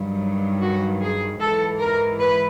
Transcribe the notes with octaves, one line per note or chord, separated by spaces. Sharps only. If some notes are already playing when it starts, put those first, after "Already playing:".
Already playing: G2 D#3 F#3
F#4
G#4
G#2 E3 A4
A#4
B4